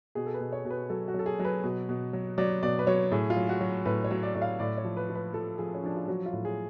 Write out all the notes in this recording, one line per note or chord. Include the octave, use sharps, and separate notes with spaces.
B2 G#4
A4
B4
B2
C#5
B2
B4
F#3 A4
F#4
F#3
A4
G#4
F#3
B4
B2
B2
F#3
F#3 D5
B2 D5
B4
F#3 C#5
A2 G#4
F4
F#3
F#4
F#3
A2 B4
C#5
F#3
D5
A2 D5
F5
A2 D5
C#5
F3
B4
F3
B4
F3 A4
F3 G#4
C#4
F3 D4
F4
F#3 F#4
F4
A2
G#4